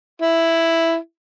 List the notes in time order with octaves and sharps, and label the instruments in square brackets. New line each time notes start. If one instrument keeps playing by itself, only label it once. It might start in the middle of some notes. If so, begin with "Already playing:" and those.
[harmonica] E4